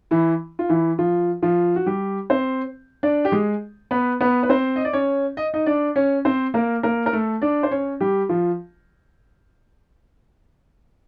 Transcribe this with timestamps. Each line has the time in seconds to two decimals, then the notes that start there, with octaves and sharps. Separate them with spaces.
0.11 E3 E4
0.59 F4
0.69 E3 E4
0.99 F3 F4
1.42 F3 F4
1.76 F#4
1.86 G3 G4
2.30 C4 C5
3.03 D4 D5
3.25 G4
3.32 G#3 G#4
3.91 B3 B4
4.21 B3 B4
4.43 B4
4.49 C4 C5
4.76 D#5
4.85 D5
4.93 C#4 C#5
5.37 D#5
5.54 D#4 D#5
5.66 D4 D5
5.96 C#4 C#5
6.25 C4 C5
6.54 A#3 A#4
6.83 A#3 A#4
7.06 A#4
7.13 A3 A4
7.42 D4 D5
7.63 C5
7.71 C#4 C#5
8.00 G3 G4
8.29 F3 F4